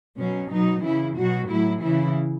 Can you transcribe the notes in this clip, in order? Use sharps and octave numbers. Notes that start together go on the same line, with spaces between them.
B2 F#3 C#4
B2 F#3 D#4
C#3 E3 E4
B2 F#3 F#4
A2 F#3 E4
C#3 E3 E4